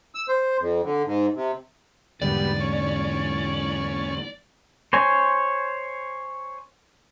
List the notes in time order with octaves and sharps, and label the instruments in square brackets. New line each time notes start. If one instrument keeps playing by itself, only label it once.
[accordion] E6
C5
F2
D3
G#2
C3
[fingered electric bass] E2 G#2 D3 [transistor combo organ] B2 G3 [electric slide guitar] D5
[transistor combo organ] C#4 C#5
[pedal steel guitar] C5 C#5 G#5